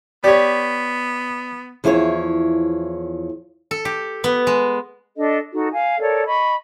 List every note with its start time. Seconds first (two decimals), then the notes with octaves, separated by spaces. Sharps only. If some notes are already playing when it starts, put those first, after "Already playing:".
0.24 B3 G4 C#5 D5
1.84 E2 F3 E4 G#4 C5 C#5
3.71 A4
3.85 G4
4.24 B3
4.47 G#3
5.16 D4 A4 D#5
5.53 D#4 F#4 A4
5.73 F5 G#5
6.00 A4 A#4 C#5 D5
6.25 D#5 B5 C#6